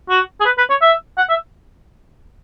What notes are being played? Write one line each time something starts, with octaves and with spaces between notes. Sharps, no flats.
F#4
G#4
B4
B4
C#5
E5
F#5
E5